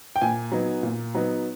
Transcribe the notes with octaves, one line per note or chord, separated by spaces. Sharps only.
G5
A#2 G#5
F#3 B3 D#4
A#2
F#3 B3 D#4